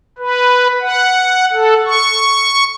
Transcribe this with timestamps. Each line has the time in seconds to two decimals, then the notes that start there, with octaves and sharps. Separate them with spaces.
0.18 B4
0.81 F#5
1.53 A4
1.86 C#6